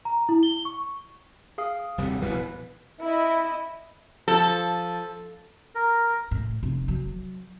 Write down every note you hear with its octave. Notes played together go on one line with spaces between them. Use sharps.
A#5
E4
G7
C#6
G#4 F5 D#6
D#1 C3 G3
A#1 B2 E3 B4
E4 D#5
F3 A4
A#4
A2
F1
F#3